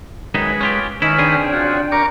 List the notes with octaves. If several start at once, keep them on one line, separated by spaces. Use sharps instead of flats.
F#2 D#3 G#3 D#4 B4
C#4 F4 G4
D#3 C#4 D#4 E4 B4
C#3 C4 D4 G#4 G5
F4 F#4
A#4 A#5 C#6 D6